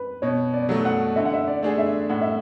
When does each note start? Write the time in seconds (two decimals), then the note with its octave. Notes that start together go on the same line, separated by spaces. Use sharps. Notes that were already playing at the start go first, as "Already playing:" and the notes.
Already playing: B4
0.22 B2 C#5
0.54 D5
0.69 F#3 A3
0.85 F#5
1.16 D3 E5
1.25 F#5
1.34 E5
1.47 D5
1.63 A3 D4 G#4
1.78 E5
2.10 A2 F#5
2.21 E5